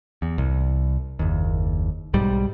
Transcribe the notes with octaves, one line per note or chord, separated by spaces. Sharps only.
E2
C2
F#1 D#2
B1 G#2 G3